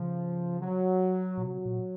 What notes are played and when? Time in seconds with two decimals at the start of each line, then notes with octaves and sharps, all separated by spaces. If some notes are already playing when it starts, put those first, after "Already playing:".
Already playing: C#3 F3
0.61 F#3
1.37 A#2
1.44 C3 F#3
1.65 A#2